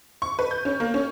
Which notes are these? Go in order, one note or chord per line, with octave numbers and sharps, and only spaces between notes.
C#6
B4
G6
C#4
A#3
C#4